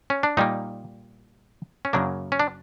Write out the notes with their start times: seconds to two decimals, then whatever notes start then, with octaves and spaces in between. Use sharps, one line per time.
0.10 C#4
0.23 D4
0.37 A#2 G3 A#3 D#4
1.85 C#4
1.93 F#2 C#3 F#3 A#3 D4
2.32 C#4
2.39 D4